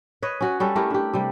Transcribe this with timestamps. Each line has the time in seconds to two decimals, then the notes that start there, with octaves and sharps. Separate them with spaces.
0.22 B4 C#5 D#5
0.41 C#4 F#4 C#5
0.60 G3 C#4 A4
0.76 A3 E4 G4 A#4
0.90 D4 G4
1.14 C3 G3